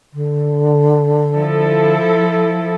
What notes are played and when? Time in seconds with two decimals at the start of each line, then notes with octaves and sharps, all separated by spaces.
0.13 D3
1.33 F3 E4 A4